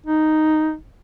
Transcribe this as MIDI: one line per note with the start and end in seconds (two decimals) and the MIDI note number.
0.06 0.74 63